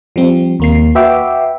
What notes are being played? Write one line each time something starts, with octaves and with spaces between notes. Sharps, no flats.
F3 G3 C4
D#2 A#3 C7
F#4 B4 E5 G5 D6